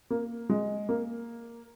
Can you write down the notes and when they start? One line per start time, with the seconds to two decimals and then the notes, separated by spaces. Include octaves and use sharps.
0.10 A#3
0.50 G#3
0.89 A#3